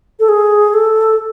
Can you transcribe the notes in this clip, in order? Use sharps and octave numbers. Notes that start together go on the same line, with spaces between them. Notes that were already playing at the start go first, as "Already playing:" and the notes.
A4
G#4
A4